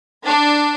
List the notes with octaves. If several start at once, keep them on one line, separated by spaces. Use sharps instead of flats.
D4